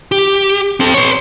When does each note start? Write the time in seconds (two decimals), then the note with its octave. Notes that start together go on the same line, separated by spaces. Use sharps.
0.12 G4
0.80 C4 A4
0.94 B4 C#5